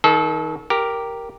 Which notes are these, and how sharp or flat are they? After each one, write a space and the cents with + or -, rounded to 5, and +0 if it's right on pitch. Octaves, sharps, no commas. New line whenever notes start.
D#3 +25 A4 -30
G4 +0 A#4 +0